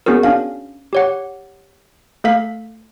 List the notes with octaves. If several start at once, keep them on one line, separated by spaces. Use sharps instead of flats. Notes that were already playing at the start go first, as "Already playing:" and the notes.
B3 C#4 F#4 G#4 A#4
C#4 D4 F5
G4 C#5 F#5
A3 A4 F5 B6